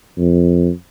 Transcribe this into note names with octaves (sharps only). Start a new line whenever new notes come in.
F2